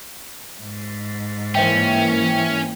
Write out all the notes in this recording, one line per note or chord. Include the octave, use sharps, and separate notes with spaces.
G#2
E3 A#3 C#4 C5 E5 G5